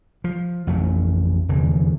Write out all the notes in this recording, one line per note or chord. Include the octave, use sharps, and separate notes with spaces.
F3
A1 F2 A3
F1 E2 D3 E3